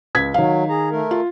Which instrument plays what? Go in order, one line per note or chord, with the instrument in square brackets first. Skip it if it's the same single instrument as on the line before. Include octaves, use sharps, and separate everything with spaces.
[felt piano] C#2 G#6 B6
[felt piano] D#3 F5 [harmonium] F#3
[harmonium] G#4 A#5
A3 A#4
[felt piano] F4